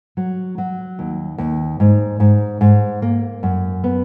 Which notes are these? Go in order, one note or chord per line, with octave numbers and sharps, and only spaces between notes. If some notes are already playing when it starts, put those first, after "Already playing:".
F#3
F#3
D#2
D#2
G#2
G#2
G#2
A#3
F#2
B3